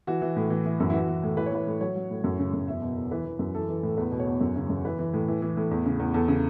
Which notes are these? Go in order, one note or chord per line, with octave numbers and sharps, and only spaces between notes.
E3 F#4
E3
A2
E3
E3
F#2
E4
E3 F#4
E3
A2
E3 B4
C#5
E3 B4
A2
F#3 C#5
F#3
A2
F#2
C#3
F#2
E2 E5
B2
E2
E3 B4
E3
F#2
E3 A4
E3
A2
E2 B4
B2
C#5
E2
F#2
C#3
F#2
E3 B4
E3
A2
E3
E3
A2
E2
C#3
E2
E2 A4
C#3